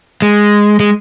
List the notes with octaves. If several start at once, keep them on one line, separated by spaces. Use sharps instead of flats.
G#3
G#3